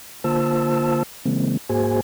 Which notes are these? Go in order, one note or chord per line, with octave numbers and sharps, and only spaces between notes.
D3 A#3 F4 C5 A5 E6
C#3 E3 G#3 A#3 C4
G#2 A#3 F#4 G#4 C5 G#5